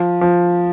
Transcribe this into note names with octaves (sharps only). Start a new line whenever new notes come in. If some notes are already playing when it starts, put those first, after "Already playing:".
Already playing: F3
F3